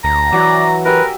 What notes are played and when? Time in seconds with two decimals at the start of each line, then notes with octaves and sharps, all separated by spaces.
0.04 D2 A#5
0.33 E3 F#3 F#4 D5
0.85 G4 A#4 B4 E5 G#5